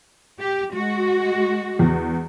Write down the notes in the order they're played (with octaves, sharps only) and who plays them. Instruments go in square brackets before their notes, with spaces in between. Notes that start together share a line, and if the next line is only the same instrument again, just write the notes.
[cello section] G4
G#3 F#4
[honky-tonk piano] E2